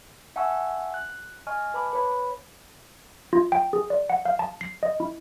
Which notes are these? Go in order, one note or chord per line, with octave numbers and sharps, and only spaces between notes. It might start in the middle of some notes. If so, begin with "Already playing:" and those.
E5 F#5 G#5 A5 C#6 E6
F#6
D#5 G#5 C#6 F6
B4 A5 B5 D6
B4 C#5 B5
F4
G5
G#4
D5
F#5
F5
A5
C7
D#5
E4